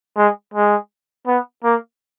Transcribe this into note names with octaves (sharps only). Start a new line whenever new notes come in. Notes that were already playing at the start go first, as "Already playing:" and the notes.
G#3
G#3
B3
A#3